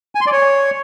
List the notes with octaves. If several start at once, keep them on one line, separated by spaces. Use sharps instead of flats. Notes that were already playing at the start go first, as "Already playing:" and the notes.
G#5
C6
D5
C#5